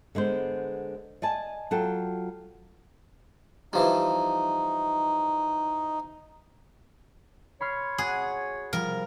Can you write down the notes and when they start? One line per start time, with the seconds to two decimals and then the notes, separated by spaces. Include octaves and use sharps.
0.15 D3 G#3 B3 C5
1.22 D5 D#5 G#5 A5
1.71 F#3 F4 A4 G5
3.73 E3 F3 G3 D#4
7.61 C#5 B5 C6 F6
7.98 F#4 G#4 F#6
8.73 F3 G3 A#4